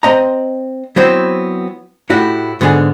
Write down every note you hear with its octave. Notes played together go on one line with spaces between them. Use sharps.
C4 D#5 A#5
F#3 B3 C4 E4 C5
A2 E4 F#4 G4
G#2 D3 B3 G#4